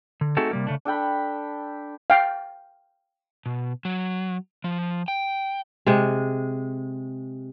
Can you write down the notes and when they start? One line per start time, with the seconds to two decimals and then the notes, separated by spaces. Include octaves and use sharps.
0.21 D3
0.37 A3 C4 D#4 F#4 G#4 A4
0.51 C3 G3 A#3
0.67 C#3 A3 D4
0.85 D4 A4 G5 B5
2.10 F5 G5
3.46 B2
3.85 F#3
4.64 F3
5.08 G5
5.86 C3 G#3